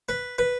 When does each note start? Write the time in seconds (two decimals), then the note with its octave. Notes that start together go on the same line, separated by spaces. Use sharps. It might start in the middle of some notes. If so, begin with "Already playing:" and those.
0.09 B4
0.38 B4